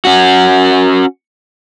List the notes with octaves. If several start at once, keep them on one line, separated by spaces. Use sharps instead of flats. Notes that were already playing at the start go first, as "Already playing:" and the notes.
C#4 F#4